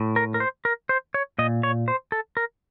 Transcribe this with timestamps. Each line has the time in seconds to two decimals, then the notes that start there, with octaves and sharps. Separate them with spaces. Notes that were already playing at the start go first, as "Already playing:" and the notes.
Already playing: A2
0.16 A#4
0.34 A#4
0.40 C5
0.65 A#4
0.89 C5
1.14 C#5
1.38 A#2 D#5
1.63 C#5
1.88 C5
2.12 A4
2.37 A#4